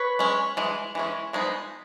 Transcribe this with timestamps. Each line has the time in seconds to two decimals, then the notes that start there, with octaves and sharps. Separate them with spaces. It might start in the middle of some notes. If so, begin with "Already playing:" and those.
Already playing: B4 C#5
0.19 G#3 C#4
0.57 E3 G#3
0.95 E3 G#3 C#4
1.33 F3 G#3 B3 D#4